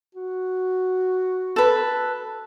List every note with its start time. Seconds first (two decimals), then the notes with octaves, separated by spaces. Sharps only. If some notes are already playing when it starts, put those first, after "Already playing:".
0.15 F#4
1.56 A4 B4